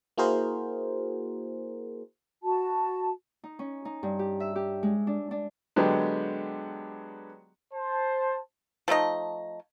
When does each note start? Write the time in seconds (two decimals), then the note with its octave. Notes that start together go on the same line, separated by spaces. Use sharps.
0.18 A#3 E4 F#4 G#4 A#4 C5
2.43 F#4 A5
3.44 D#4
3.59 C#4
3.85 D#4
4.03 G2
4.19 G4
4.40 E5
4.56 G4
4.83 G#3
5.07 D4
5.31 D4
5.76 D3 F#3 G#3 B3 G4
7.74 C5 A5
8.88 F3 A3 D#4 D#5